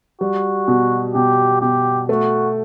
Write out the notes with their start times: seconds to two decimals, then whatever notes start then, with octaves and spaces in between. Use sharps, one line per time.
0.21 G3 F#4
0.68 B2
1.15 B2 G4
1.62 B2 G4
2.09 A3 F#4